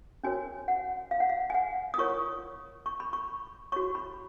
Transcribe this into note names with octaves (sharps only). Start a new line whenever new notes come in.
C#4 F#4 A#4 C#5 G#5
F#5
F5
F#5
F5
G#5
F#5
D#6
F4 A#4 C#5 C#6
C#6
B5
C#6
F#4 C#5 C#6
B5